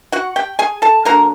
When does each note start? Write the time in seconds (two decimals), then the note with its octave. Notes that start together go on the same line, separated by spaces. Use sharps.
0.12 F#4 F#5
0.36 G4 G5
0.59 G#4 G#5
0.82 A4 A5
1.05 D3 F#3 A#3 A#4 A#5